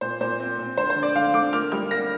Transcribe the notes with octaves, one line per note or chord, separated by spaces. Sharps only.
A#2 C5
A#2 C5
C4
A#2
D3 C5
C5
D3
D5
D3 F5
D3 D6
A#3 F6
G3 F6
A#3 A#6